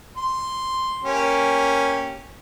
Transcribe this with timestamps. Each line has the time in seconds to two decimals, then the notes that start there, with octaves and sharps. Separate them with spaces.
0.17 C6
1.03 A#3 C#4 G4